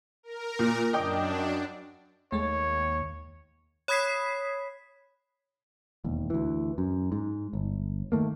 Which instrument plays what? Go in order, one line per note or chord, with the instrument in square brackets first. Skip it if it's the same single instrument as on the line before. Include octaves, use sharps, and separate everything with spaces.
[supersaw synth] A#4
[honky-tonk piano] A#2
[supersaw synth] F#2 D4 [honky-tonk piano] D#5 G5 D6
[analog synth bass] D#2 [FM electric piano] G#3 A3 [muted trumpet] C#5
[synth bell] C#5 B5 D#6 G#6 B6 C7
[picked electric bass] E1 D#2
D2 E3
F#2
G#2
G1
D#3 E3 A3 A#3